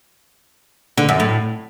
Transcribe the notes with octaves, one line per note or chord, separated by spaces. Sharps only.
D3
F#2
A2